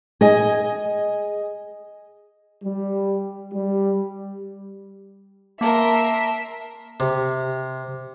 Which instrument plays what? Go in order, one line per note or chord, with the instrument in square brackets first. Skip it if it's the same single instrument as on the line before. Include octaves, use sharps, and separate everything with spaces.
[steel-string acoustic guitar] G#4 D#5 G#5
[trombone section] G3
G3
[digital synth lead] A#3 [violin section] A#4 C6 [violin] E5 [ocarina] A5
[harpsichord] C3